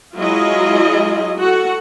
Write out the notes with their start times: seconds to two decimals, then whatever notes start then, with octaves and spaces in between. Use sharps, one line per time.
0.16 F#3 G#3 E4 F4 G#4 D#5
1.38 F#4 A4 F#5